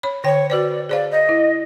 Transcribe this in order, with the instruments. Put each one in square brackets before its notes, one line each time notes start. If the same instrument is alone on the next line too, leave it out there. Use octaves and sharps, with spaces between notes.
[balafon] C#5 B5
[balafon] D3 G5 [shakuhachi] C#5
[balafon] F#4 B4 C5 [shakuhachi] D5
[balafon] G#4 C5 F5 [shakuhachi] D5
[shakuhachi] D#5
[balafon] E4